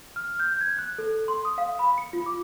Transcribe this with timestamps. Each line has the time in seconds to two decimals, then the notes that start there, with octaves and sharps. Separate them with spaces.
0.16 F6
0.40 G6
0.61 G#6
0.79 F#6
0.98 A4
1.28 C6
1.45 D#6
1.58 F5
1.79 B5
1.98 C#7
2.13 F4
2.26 D6